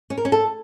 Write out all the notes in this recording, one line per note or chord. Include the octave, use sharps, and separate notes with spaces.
C#4
A#4
C#4
A4